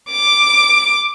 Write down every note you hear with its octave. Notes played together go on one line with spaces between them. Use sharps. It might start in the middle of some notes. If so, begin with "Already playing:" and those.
D6